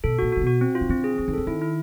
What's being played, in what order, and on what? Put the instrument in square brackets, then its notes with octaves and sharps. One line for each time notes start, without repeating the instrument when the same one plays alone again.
[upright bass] B2 [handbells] A4
[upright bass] A#2 [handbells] F#4
[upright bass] C3 [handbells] F#4
[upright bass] B2
[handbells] F#4
C4
F4
[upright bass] D#3
[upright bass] D3 [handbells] C4
[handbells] G#4
[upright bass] E3 [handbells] C4
[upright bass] D#3
[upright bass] D3 [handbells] A4
[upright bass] D#3 [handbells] E4
[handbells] E4